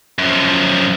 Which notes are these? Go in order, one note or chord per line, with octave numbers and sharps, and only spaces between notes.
F#2 F3